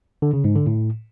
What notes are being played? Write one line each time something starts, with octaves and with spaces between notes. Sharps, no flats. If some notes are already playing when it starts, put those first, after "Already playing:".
D3
C#3
G#2
D3
A2